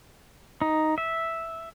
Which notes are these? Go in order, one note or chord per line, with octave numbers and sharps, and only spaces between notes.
D#4
E5